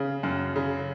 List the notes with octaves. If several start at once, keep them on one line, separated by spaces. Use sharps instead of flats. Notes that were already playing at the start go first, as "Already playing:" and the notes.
Already playing: C#3
F#2
C#3